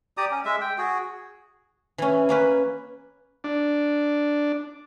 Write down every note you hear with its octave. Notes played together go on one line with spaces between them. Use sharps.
G4 D5 A#5 D#6
C#4
G#3 E5
G5
F#4 G#4
E3 C#4
A#3 C#4 B4
D4